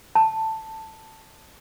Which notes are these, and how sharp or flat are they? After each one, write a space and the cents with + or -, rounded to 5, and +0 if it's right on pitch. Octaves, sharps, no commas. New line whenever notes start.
A5 +10